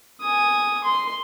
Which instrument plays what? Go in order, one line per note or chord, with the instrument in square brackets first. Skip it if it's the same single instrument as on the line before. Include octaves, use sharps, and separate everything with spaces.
[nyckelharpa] G#5 D#6
C6